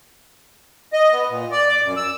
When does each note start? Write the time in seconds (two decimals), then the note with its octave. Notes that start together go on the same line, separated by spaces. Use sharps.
0.93 D#5
1.12 B3
1.30 A#2
1.51 D5
1.69 D6
1.84 F#2
1.97 E6